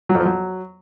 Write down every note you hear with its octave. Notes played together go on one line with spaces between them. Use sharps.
F#3
F2
F3
F#3